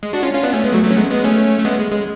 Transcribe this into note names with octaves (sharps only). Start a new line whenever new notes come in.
G#3
D4 F#4
C#4 F4
C#4 F4
B3 D4
A3 C#4
G#3 B3
F#3 A3
F#3 A3
C#4
G#3 B3
G#3 B3
A3 C#4
A3
G#3 B3
G#3
G#3